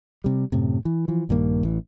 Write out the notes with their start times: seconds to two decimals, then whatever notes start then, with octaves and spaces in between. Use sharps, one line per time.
0.24 C3 G3
0.52 F#2 A2 C3
0.85 E3
1.08 E3 F3
1.29 A#1 G2 D#3 A#3
1.63 A1 E3